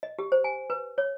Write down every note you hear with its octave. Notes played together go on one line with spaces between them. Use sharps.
D#5
G4
C5
G#5
B4
C#5